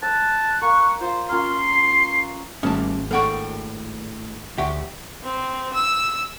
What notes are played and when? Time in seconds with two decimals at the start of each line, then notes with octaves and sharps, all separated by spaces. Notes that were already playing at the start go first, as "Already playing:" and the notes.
0.02 A5 E6 F#6
0.62 A#3 C#6
1.01 F4 C5
1.29 A#3 C#4 F4 C6 F6
1.57 C7
2.63 G#1 G3 A3 A#3 C#4 A5
3.11 A2 G#3 A#3 D4 A4 F#5 G5 C#6
4.58 D2 G4 E5 F#5 C#6
5.23 C4
5.74 E6